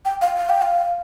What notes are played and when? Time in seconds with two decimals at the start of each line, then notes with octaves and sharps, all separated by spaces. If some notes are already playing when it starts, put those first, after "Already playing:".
0.05 G5
0.21 F5
0.37 F5
0.50 G5
0.62 F5